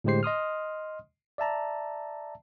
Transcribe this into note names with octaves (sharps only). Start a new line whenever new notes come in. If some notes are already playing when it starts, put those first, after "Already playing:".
A2 D3 G#3 G4 C5 C7
D#5 C6 D#6 F6
D5 E5 A5 A#5